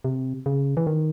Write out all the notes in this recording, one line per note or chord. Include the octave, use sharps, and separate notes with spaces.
C3
C#3
E3
D#3